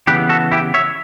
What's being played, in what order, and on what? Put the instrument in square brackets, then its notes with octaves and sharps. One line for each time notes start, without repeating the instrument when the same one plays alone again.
[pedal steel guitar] C#3 E3 B3 G4 B4
F#4 A4
E4 G4
C#5 E5